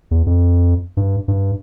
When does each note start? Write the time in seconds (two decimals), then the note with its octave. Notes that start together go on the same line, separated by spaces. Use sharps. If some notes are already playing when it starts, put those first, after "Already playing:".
0.11 E2
0.27 F2
0.97 G2
1.28 G2